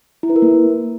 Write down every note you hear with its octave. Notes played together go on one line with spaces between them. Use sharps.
E4
B4
A#4
A#3